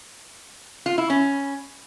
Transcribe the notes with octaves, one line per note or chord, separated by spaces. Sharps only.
F4
E4
C#4